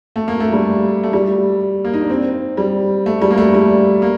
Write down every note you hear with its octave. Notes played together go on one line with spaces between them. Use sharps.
A3
A#3
A3
G3
A3
G3
A#3
D#4
D4
C4
G3
A3
G3
A#3
A3
G3
A#3